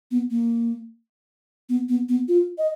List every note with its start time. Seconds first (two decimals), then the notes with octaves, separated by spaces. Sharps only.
0.11 B3
0.31 A#3
1.69 B3
1.89 B3
2.09 B3
2.28 F4
2.58 D#5